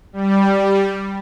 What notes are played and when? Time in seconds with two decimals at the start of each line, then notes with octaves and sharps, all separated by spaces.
0.13 G3